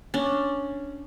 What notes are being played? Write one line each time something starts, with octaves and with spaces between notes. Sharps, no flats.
C#4 D4